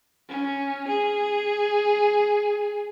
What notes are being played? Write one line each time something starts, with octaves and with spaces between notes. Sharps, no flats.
C#4
G#4